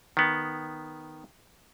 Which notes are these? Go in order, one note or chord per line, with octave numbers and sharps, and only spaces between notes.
D#3 B3